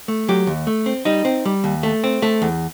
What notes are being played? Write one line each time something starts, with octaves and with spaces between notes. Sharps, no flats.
A3
F#3 G4
D#2
A3
C4
G3 D#4
C4
G3
D#2
A3
C4
A3
E2